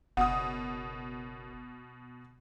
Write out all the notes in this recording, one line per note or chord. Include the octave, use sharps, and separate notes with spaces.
F#1 B2 F#5 D#6